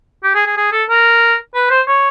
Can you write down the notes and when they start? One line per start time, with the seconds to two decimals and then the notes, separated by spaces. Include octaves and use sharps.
0.23 G4
0.35 G#4
0.46 G#4
0.57 G#4
0.72 A4
0.89 A#4
1.55 B4
1.70 C5
1.87 C#5